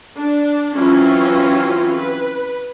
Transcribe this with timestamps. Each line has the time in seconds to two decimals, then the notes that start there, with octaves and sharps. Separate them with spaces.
0.16 D4
0.75 E3 F#3 C4 C#4 F4
1.94 B4